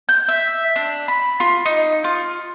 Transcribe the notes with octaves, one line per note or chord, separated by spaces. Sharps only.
G6
E5
D4
B5
F4
D#4
F4